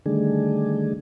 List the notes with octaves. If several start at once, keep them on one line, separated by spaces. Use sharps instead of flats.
D3 D#3 G3 A3 D4 G#4